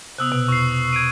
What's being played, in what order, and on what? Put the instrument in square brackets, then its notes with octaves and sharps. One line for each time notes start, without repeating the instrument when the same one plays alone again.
[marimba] C3 B3 [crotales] D#6 E6 F#6
[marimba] B2
[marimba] E2 [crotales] C#6 C7
[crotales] G#6 D7 D#7